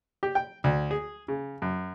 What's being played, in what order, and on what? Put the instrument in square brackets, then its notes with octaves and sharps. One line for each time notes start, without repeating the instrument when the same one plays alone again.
[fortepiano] G4
G5
D2
G#4
C#3
F#2